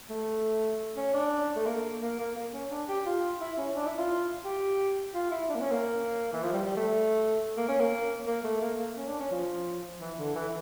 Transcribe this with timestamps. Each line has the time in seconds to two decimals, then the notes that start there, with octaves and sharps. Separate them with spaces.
0.10 A3
0.97 C#4
1.14 D4
1.56 A3
1.66 A#3
2.02 A#3
2.19 A#3
2.35 A#3
2.53 C#4
2.71 D4
2.88 G4
3.06 F4
3.41 E4
3.58 C#4
3.75 D4
3.86 E4
3.98 F4
4.45 G4
5.14 F4
5.31 E4
5.49 D4
5.55 A#3
5.61 C#4
5.71 A#3
6.33 E3
6.43 F3
6.53 G3
6.65 G3
6.77 A3
7.57 A#3
7.69 C#4
7.80 A#3
8.27 A#3
8.44 A3
8.61 A#3
8.79 A#3
8.97 C#4
9.08 D4
9.20 C#4
9.31 F3
10.00 E3
10.18 D3
10.35 E3